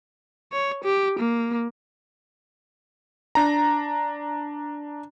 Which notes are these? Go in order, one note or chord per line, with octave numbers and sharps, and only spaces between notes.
C#5
G4
A#3
D4 A#5